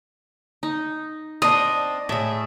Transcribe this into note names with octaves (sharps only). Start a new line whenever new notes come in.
D#4
C4 D4 D#5 D#6
A2 G#4 E5